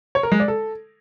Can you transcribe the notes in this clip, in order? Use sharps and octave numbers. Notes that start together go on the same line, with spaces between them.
C#5
A#4
G#3
D5
A4